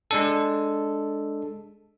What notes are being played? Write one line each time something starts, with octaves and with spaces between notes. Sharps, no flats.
G#3 D4 A4